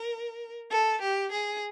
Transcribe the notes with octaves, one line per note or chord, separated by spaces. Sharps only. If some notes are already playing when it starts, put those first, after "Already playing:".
Already playing: A#4
A4
G4
G#4